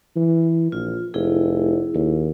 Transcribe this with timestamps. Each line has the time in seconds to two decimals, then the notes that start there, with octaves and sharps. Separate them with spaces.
0.16 E3
0.72 A#1 F4
1.14 F1 E4 G#4
1.94 D#2